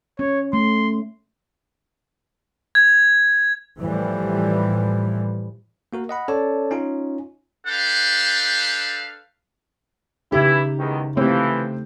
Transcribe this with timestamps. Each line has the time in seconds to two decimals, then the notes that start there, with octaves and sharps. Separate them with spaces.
0.19 C#4 C#5
0.53 A3 C6
2.75 G#6
3.79 A2 E3 F3 G3
5.93 A#3 F#4 A#4
6.09 D#5 F#5 B5
6.28 C#4 A4 C#5 D5 A5
6.71 C#4 D#4 F4
7.66 D4 A4 B4 F5 G5
10.32 C#3 E3 D#4 E4 G4
10.78 E2 G#2 D#3
11.17 C3 E3 F3 A3 C4